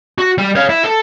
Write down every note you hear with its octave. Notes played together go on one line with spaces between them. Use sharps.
F#4
G3
C#5 F5
E4
A4